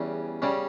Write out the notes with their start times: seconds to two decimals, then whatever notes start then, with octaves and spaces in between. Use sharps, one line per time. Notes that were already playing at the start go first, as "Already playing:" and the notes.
Already playing: E2 C#3 G3 C#4
0.42 C#3 G3 C#4